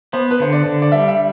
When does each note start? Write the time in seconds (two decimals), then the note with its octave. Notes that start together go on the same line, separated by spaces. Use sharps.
0.13 B3 C5
0.31 B4
0.40 D3 C5
0.53 D5
0.66 D3
0.82 D5
0.92 G3 E5
1.08 E5